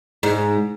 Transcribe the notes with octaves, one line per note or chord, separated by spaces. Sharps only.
G#2